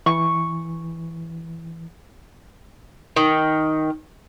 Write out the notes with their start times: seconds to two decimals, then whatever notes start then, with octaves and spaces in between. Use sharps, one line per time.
0.06 E3 C#6
3.16 D#3